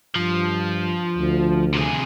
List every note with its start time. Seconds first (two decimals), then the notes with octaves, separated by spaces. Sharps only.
0.15 G2 F3
1.18 D2
1.74 C3 G#4